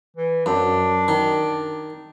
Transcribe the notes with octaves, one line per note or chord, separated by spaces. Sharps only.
E3
F#2 D4
D#3